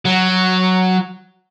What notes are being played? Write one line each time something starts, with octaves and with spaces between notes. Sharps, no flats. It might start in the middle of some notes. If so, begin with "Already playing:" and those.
F#3